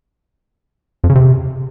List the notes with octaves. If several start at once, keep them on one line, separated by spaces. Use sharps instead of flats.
F2
C#3
C3